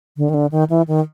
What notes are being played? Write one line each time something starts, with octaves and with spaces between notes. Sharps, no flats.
D3
D#3
D3
D#3
E3
D#3